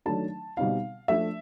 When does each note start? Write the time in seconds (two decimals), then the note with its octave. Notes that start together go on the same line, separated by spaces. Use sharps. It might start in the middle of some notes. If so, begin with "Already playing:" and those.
0.06 D#3 F#3 A3 D4 A5
0.57 B2 G3 C4 D#4 F5
1.08 F3 A3 D4 E5